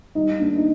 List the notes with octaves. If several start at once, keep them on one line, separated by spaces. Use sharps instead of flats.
G3 D#4
A#3 D4
D#4